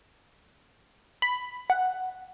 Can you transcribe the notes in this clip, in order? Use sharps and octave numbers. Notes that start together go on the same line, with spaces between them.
B5
F#5